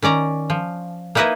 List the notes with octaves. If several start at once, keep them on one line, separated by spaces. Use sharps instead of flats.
D#3 C#4 D5 A#5
F3
A#3 D#4 E4 B4 D#5 E5